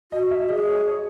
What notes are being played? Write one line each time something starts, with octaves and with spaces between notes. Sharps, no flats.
F#4 D#5
E5
G#4 D#5
C#5
C#5